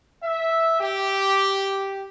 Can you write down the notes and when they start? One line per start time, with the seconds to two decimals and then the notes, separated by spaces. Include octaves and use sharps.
0.24 E5
0.80 G4